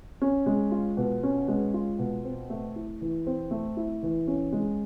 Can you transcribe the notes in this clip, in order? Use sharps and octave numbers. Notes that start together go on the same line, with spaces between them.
C#4
G#3
F4
B2
C#4
G#3
F4
B2
C4
A3
E4
E3
C4
A3
E4
E3
C#4
G#3